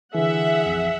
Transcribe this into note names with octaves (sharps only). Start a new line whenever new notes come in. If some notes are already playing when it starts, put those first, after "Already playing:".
D3 E3 G#4 E5 F#5
A#1 F2